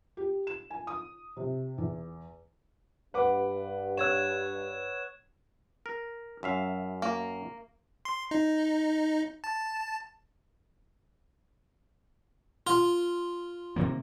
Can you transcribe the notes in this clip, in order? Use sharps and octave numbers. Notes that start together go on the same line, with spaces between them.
G4
E7
G#5
D#6
C3
E2
G2 B4 F#5 D6
C#5 E6 F#6 G#6 E7
A#4
F#2 E5 F5
A#3
C6
D#4
A5
F4
C3 D#3 A#3